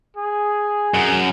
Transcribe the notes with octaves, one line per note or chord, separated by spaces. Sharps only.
G#4
F#2